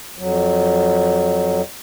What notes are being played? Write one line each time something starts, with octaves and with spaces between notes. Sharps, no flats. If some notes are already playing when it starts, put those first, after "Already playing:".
F2 F#3